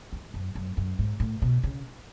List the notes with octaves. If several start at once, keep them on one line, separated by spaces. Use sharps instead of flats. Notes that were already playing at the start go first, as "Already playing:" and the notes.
E2
F#2
F#2
F#2
G#2
A2
B2
C#3